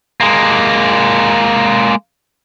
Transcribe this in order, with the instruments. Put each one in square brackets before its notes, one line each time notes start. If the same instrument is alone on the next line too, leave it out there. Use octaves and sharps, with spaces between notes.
[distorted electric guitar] G#3 A#3